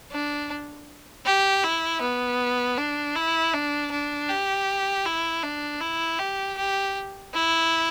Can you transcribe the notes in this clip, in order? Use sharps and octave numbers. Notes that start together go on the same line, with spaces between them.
D4
G4
E4
B3
D4
E4
D4
D4
G4
E4
D4
E4
G4
G4
E4